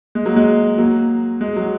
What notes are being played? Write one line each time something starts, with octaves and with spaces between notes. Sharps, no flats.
G#3
F#3 A#3
G#3
F#3 A#3
G#3
F#3